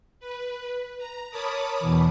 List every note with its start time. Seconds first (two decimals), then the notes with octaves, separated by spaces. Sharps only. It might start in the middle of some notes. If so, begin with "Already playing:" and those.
0.20 B4
0.98 A#5
1.31 A#4 C#5 A5 B5 D6 D#6
1.80 E2 B2 E3